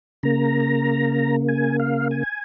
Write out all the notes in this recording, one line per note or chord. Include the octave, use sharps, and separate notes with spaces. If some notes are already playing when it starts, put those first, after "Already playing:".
C#3 A#3 A#5
G#5
F5
G#5